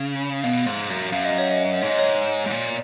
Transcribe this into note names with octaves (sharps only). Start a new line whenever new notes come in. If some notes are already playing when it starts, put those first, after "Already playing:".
Already playing: C#3
B2 F5
G#2
F#2
F#2 F5
D#5
C#5
D#5
G#2 C#5
D#5
C#5
G#2
A#2